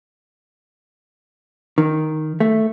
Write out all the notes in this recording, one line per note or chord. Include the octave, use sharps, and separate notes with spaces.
D#3
A3